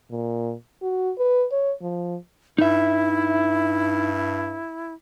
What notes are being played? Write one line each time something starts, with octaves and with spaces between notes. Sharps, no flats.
A#2
F#4
B4
C#5
F3
G2 D#4 E4 E5